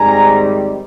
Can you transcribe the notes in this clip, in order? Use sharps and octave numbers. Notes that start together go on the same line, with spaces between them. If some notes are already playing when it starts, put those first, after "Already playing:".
Already playing: G#2 D#3 G3 C4 D#4 G#5 A#5